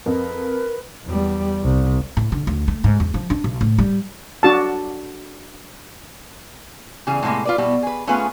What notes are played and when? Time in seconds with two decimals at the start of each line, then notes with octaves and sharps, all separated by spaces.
0.06 F2 A#4 B4
1.06 E2 G3
1.63 C2
2.17 A2
2.32 D3
2.47 D2
2.68 A3
2.84 G#2
3.00 E2
3.14 F3
3.30 D4
3.44 B1
3.61 A2
3.78 G3
4.43 D4 F#4 A5
7.07 C#3 E3 G3 G#4
7.23 A2 C3 F3 G#3 A#3
7.45 F4 B4 D5
7.58 B2 G3 B3 E4
7.83 G#4 B4
8.07 A3 B3 C#4 F4 G#4 B4